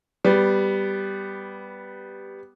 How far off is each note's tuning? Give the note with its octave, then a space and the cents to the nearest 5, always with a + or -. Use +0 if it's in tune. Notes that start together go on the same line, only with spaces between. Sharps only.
G3 +0 B3 +5